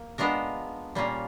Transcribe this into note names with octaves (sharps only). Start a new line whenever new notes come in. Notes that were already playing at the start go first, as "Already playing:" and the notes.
Already playing: A#3
G#3 B3 D4 F4 A#4
A#2 G3 A#3 C#4 F4